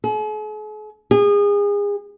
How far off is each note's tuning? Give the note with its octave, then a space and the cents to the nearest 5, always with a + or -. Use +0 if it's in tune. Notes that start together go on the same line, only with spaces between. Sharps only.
G#4 +45
G#4 -30